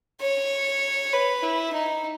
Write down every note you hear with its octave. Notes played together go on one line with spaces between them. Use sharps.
C#5
B4
E4
D#4